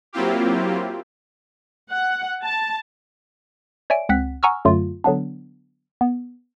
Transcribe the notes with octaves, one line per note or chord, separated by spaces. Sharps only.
F#3 A#3 C4 E4 F4 G4
F#5
A5
C#5 D5 E5 G#5 D7
C#2 C4 F#5 F#6 B6
F#5 G#5 A#5 C#6 E6 F6
F#2 D3 F#3 A3 F4
D3 F#3 B3 D4
B3